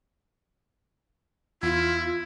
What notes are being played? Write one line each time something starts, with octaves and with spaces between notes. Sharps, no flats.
E2 E4 F4